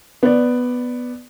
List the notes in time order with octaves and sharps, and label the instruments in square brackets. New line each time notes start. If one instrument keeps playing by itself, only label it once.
[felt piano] B3 D5